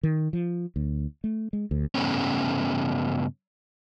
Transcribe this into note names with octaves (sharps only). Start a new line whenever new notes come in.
D#3
F3
D2
A3
G#3
D2
G2 C#3 A3 B3 C#4